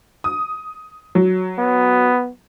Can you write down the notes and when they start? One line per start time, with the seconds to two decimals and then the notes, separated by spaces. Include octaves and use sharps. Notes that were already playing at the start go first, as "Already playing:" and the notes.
0.24 D#6
1.15 F#3
1.58 B3